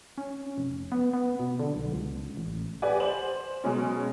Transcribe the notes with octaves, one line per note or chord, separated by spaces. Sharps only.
C#4
F1
B3
B3
B2
D3
B1
C#2
A1
G4 B4 D5 F#5 G#5
C5 E7 F#7
B2 F#3 G#3 C#4